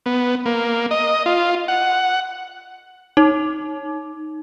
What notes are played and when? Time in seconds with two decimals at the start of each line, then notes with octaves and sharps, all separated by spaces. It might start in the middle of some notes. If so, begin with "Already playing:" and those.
0.06 B3
0.46 A#3
0.91 D#5
1.26 F4
1.68 F#5
3.17 D#4